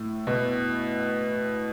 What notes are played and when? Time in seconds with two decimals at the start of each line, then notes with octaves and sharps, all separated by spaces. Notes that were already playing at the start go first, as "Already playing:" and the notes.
Already playing: A2
0.27 B2